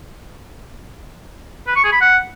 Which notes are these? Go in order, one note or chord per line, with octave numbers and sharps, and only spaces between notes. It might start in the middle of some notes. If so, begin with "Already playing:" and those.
B4
C#6
G#4
B5
F#5